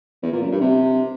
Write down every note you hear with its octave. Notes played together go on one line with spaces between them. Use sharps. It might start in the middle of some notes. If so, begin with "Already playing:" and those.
E2
A#2
F#2
G2
C3